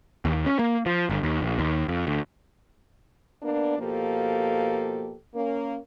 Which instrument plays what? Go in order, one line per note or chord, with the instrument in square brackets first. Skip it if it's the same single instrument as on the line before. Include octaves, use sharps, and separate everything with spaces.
[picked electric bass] D#2
C#4
A#3
F3
G1
D#2
A#1
D#2
F2
D2
[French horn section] A#3 B3 D4
B2 F3 A#3 G4 A4
A#3 C#4